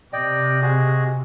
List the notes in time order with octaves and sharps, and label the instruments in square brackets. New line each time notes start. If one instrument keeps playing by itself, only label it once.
[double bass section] C3 [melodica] D5 D#5 G5
[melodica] F#4 G#4 D#5